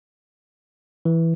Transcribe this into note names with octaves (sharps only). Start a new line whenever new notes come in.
E3